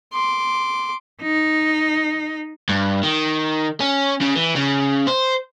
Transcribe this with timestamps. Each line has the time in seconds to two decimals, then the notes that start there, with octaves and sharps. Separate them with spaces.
0.13 C6 D6
1.22 D#4
2.69 G2
3.03 D#3
3.81 C#4
4.22 C#3
4.36 E3
4.56 C#3
5.08 C5